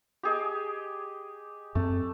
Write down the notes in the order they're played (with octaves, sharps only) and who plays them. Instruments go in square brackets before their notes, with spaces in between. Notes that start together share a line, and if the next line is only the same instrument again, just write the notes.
[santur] G4 G#4 D#5
[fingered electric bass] F#2 C4 [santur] A3